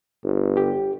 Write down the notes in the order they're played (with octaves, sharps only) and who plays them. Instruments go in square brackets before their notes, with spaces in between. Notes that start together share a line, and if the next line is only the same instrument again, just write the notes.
[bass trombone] G1
[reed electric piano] G4